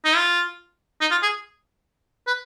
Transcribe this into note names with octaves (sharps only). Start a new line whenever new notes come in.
D#4
F4
D#4
F4
G#4
B4